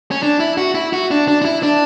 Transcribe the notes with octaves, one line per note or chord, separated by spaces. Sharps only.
C#4
D4
E4
F#4
E4
F#4
D4
D4
D4
E4
D4